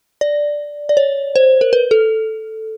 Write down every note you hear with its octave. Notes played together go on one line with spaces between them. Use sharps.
D5
D5
C#5
C5
A#4
B4
A4